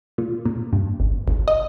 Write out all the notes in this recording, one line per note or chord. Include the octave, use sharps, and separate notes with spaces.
A#2
A#2
G2
G#1
G#1
D#5